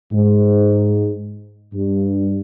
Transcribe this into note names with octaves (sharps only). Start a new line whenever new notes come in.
G#2
G2